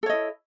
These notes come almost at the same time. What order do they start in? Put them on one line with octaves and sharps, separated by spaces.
A4 C#5 D#5 E4